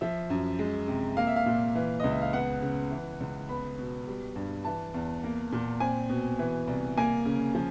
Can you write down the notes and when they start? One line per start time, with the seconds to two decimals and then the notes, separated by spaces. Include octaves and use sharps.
0.01 F3 E5
0.30 F#2
0.59 G#3
0.88 C3
1.17 A#3 F5
1.27 E5
1.36 F5
1.46 A#2
1.75 E3
2.00 C#2 D#5
2.11 E5
2.22 F5
2.33 B3 F#5
2.62 C#3
2.91 E3
3.20 C#2
3.49 B3 B5
3.79 B2
4.07 G3
4.36 G2
4.65 E3 A5
4.94 E2
5.24 A#3
5.52 A#2
5.80 C4 G#5
6.09 B2
6.39 E3
6.67 C2
6.98 A#3 G#5
7.26 C#3
7.55 F3